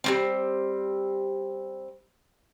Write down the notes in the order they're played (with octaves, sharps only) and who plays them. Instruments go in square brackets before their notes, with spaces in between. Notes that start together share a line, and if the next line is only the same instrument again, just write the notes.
[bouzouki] G3 A#3 C4